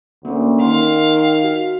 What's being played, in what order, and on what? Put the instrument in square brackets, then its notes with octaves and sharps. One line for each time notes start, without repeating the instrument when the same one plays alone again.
[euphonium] D2 [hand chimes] A#3 C#4
[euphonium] D#3 [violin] F5 [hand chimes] C6
[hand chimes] F#4